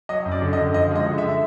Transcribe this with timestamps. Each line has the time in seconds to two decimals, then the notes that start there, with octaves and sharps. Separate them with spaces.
0.09 F#3 D#5
0.25 F#2
0.31 D5
0.42 D3
0.53 D#5
0.59 F#2
0.74 F3 D#5
0.91 G#3 D#5
1.07 D3
1.18 E5